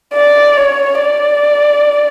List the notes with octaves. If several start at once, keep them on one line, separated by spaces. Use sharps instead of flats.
D5
C#5
D5